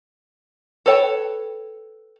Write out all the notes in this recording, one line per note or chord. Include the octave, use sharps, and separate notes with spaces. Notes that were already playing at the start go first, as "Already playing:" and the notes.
A4 B4 C#5 G5